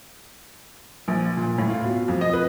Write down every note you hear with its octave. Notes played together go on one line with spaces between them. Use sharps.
A#1
A#2
A2
F4
B2
F2
D#5
B4